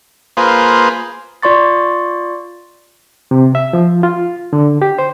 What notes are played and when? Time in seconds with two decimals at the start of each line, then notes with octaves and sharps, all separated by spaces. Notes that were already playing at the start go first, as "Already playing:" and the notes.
0.37 A#3 F4 G#4 B4 C5
1.43 F4 D5 C6 C#6 A6
3.31 C3
3.55 E5
3.73 F3
4.03 F4
4.53 D3
4.82 G4
4.99 C5